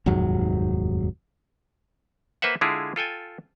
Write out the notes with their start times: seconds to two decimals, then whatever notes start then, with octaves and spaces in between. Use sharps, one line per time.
0.06 F1 D#2 G#2 F#3
2.42 A#3 B4 C5 E5 F#5
2.61 D3 G#3 E4 F4 G#4
2.96 F4 A4 G5 G#5